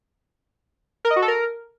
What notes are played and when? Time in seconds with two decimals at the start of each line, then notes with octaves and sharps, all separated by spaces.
1.05 A#4
1.10 D#5
1.16 F#4
1.22 A4
1.28 A#4